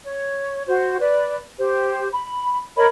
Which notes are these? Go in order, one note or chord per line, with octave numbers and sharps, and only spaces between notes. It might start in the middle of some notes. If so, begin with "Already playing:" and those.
C#5
F#4 C5
B4 D5
G4 C5
B5
A#4 C#5 D#5 B5